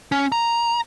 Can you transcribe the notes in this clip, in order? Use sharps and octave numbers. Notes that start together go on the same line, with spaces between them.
C#4
A#5